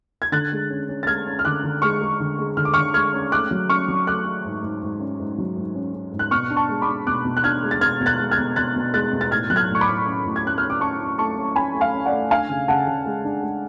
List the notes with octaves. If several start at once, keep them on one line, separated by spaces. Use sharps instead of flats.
G#6
D3 F#6 A6
G#3
C#4
C#4
A6
G#3 F6 G#6
C#4
F6
D3 D6 F#6
D3
G#3 C#6 F6
G#3
D3
G#3
D3 F6
D6
D3 C#6 F6
G#3 F6 G#6
C#4
A3 D6 F#6
F#3
C#4 C#6 F6
F#3
A3 D6 F#6
A3
G#2
G#2
G#2
C#4
G#2
F#3
G#2
C#4
C#4
G#2
F#6
B2 C#6 F6
D4
A5 C#6
G#3
B5 D6
D4
B2 D6 F#6
B2
F#6
D4 F6 G#6
G#3
A6
B2 F6 G#6
B2
F#6 A6
G#3
F6 G#6
B2
B2 F#6 A6
B2
G#3 F#6 A6
B2
A6
A2 F6 G#6
F#3 F#6
F6 G#6
A2
C#6
B5 D6
A2
C#4
A2
G#6
C#4 F#6
C#4 F6
D6
C#4 A5 C#6
C#4
A3 A5 C#6
C#4
C#4 G#5 B5
A3
F5 G#5
C#4
D5 F#5
A3
D4 F5 G#5
C#3
C#3 F#5 A5
C#3
G#3
D4
G#3